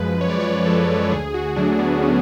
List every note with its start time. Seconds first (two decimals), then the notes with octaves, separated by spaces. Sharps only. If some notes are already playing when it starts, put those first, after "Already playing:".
Already playing: F#2 F3 G#3 B4
0.21 F#2 C#5
0.30 D5
0.40 C#5
0.66 F3 G#3 A4
1.11 D2 G#4
1.34 F#4
1.56 D3 F#3 A3 D4
1.79 B3
2.01 C#4